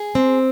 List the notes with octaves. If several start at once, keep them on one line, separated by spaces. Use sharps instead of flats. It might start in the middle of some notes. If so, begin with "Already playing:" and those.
Already playing: G#4
C4